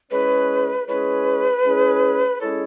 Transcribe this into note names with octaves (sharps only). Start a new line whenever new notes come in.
G#3 C#4 E4 G#4 B4 C#5
G#3 C#4 E4 G#4 B4 C#5
G#3 C#4 E4 G#4 C#5
G#3 C#4 E4 G#4 A4 C#5